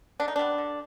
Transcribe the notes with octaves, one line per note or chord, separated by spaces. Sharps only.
D3 D4
D#4
G3 B3 D4
D3